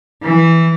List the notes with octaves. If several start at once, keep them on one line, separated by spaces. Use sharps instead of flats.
E3